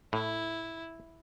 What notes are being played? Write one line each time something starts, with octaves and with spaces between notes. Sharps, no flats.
A2 E4